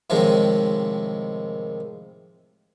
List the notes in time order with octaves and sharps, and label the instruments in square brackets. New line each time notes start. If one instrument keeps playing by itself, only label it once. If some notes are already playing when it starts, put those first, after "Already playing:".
[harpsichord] A2 C3 D#3 F3 G#3